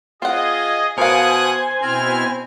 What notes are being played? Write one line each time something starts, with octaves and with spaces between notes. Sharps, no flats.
C4 F4 G#4 D#5 F#5
B2 A#4 C5 F5 G#5 D#6 F#6
B2 C4 E4 F6